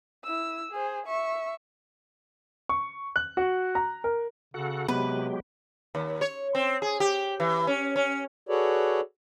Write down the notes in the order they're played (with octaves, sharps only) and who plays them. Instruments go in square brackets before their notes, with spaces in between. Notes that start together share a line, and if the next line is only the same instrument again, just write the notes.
[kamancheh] E4 E6
G#4 C5
E5 C#6
[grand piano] C#6
F#6
F#4
A#5
A#4
[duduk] C#3 [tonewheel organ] F#4 A4 F#5
[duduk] C3 [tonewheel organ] F#3 G#3 G4 [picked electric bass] B3 [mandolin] B4
[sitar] D#2
C#5
C4
G#4
G4
E3
C#4
C#4
[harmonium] F#4 G#4 A4 B4 C#5 D5